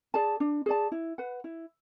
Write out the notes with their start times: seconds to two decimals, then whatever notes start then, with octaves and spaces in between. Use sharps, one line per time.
0.14 G#4 D5 A5
0.40 D4
0.66 G#4 D5 A5
0.92 E4
1.18 B4 F#5
1.44 E4